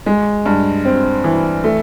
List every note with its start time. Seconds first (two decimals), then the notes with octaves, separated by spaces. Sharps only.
0.06 G#3
0.46 G2
0.85 C4
1.24 E3
1.64 A3